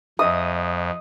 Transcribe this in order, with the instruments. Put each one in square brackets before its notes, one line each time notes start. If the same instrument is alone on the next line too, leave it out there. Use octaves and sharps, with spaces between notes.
[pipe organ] F2 [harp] D#5 E5 [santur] D#6